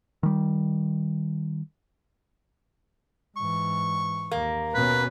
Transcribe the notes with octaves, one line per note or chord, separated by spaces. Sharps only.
D#3 G3
G#2 E3 C#6
D#2 A#3
B2 B3 C#4 B4